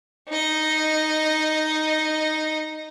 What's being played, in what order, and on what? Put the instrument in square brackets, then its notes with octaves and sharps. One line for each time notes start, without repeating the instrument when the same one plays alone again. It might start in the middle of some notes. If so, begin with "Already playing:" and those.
[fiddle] D#4 D#5